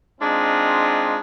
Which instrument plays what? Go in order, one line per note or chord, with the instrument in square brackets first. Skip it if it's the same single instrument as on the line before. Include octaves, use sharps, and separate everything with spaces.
[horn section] G#3 C4 D4 D#4 F4